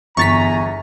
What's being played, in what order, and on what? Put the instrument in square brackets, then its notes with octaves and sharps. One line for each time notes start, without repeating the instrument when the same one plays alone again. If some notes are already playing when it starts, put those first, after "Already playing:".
[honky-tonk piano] G1 [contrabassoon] E2 [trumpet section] G#5 A#5 [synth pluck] C#6 A6 B6